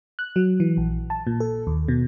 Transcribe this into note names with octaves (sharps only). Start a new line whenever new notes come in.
F#6
F#3
E3
A#1
A5
A#2
A4
D#2
B2